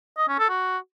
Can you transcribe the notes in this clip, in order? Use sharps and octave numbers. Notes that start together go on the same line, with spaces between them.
D#5
C#4
A4
F#4